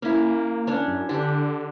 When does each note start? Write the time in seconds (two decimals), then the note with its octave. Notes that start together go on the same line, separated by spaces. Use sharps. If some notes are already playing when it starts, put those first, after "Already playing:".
0.02 A#3 C#4 E4
0.67 C#4 D4 C#5
0.87 F#2
1.09 D3 D4 G4